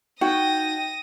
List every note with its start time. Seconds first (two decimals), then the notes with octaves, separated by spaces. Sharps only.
0.21 D#4 F#4 G5 D#6 A#6